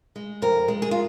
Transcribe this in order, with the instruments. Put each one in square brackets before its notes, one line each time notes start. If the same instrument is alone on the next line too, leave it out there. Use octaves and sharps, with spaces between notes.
[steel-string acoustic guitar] G#3
F2 A#4
G#3
G#4
F4